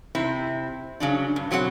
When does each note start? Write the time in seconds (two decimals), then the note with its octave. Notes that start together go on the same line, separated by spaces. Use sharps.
0.15 C3 C4 E4
1.00 C#3 F#3 D4
1.36 G2
1.51 B2 F#3 C4 A#4 F#5